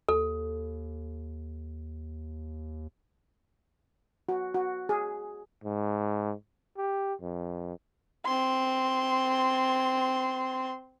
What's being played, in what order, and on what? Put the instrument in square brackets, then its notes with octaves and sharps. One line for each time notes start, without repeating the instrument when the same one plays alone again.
[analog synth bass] D#2 [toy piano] A4
[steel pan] F#4
F#4
G#4
[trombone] G#2
G4
F2
[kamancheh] C4 C6